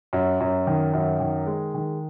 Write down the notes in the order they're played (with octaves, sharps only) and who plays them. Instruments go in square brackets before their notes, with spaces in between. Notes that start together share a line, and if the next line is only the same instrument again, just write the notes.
[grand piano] F#2
F#2
D#3
F#2
D#3
G#3
D#3